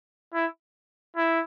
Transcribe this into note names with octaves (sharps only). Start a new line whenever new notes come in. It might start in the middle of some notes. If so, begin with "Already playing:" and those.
E4
E4